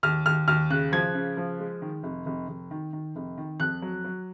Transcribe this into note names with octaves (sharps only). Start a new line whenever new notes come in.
D#2 F6
D#2 F6
D#2 F6
C#3 F#6
F3 G#6
C#3
F3
G#3
D#3
F1
F1
F1
D#3
D#3
F1
D#3
F2 F#6
F#3
F#3